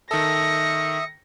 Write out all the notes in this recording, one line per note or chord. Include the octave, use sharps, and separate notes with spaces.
D#3 A4 E5 D#6 A#6 C#7